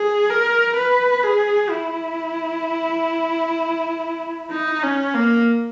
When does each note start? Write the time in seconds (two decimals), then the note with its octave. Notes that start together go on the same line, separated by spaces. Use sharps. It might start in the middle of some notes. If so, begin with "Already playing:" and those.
Already playing: G#4
0.30 A#4
0.76 B4
1.23 G#4
1.70 E4
4.51 D#4
4.83 C#4
5.14 A#3